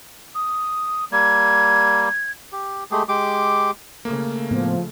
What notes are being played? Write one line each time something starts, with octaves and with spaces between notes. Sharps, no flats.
D#6
G3 A#3 G#6
G4
G#3 A3 G4 G#4
G#3 G4 D6
C#3 A3 A#3
A2 F3 B3